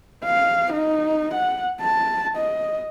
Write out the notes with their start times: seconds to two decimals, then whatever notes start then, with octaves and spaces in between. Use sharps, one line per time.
0.24 F5
0.73 D#4
1.34 F#5
1.81 A5
2.37 D#5